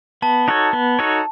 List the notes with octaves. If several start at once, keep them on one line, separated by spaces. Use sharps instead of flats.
B3 A5
D#4 F#4 A4 C#5
B3
D#4 F#4 A4 C#5